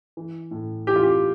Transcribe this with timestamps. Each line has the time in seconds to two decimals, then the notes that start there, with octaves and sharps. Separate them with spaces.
0.17 E3
0.51 A2
0.87 E3 G4
0.96 F4
1.03 G4